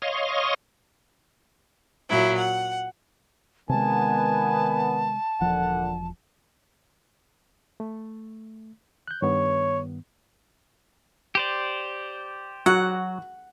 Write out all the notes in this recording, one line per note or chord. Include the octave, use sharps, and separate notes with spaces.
C#5 D#5 F5 C6 C#6 D#6
A#2 F#3 E4
F#5
C3 D#3 G#3 B3 G#5 A5
E1 A#2 D3 F3 F#5
A3
F#6 G6
G2 D#3 B3 C#5
G4 C5 D5
F#3 F#4 F#5